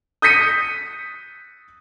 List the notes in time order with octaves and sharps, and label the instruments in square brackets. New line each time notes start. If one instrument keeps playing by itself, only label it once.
[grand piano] D#6 G6 A#6 B6 C#7 D#7